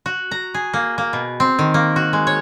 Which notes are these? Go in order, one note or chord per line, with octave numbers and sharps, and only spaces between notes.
F#4
A#5
G#4
A#3
A#3
B2
C4
D#3
A#3
F#4
G#3
C#5